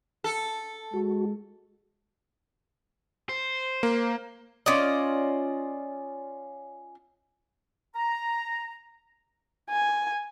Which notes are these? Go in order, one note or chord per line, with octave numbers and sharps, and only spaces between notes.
A4
G#3 F#4
C5
A#3
C#4 F4 D5 D#5
A#5
G#5